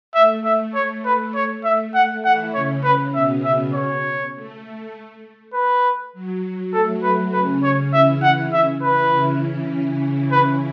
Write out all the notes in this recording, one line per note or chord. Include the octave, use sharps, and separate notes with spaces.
A3 E5
E5
C#5
B4
A3 C#5
A3 E5
F#5
E3 E4 F#5
C#3 C#4 C#5
B4
B2 B3 E5
E5
C#5
A3
B4
F#3
A3 A4
A3 B4
C#3 C#4 B4
C#5
E3 E4 E5
C#3 C#4 F#5
C#3 C#4 E5
E3 E4 B4
C#3 C#4
B4